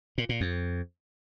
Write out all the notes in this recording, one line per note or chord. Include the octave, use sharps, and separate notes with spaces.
A#2
A#2
F2